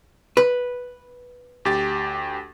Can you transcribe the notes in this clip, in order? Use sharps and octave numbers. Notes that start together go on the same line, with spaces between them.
B4
D2 G4 A6